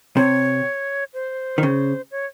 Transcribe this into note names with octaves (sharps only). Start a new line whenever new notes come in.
C3 C#5
C5
D#3
C#3
C#5